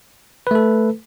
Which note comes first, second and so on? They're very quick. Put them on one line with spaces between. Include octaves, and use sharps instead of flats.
B4 A3 A4